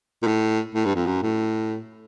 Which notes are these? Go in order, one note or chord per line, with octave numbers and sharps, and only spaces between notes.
A#2
A2
A2
G2
F2
F#2
A2